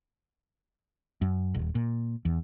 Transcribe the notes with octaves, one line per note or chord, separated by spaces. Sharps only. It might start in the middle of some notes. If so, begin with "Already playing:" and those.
F#2
D#1
A#2
E2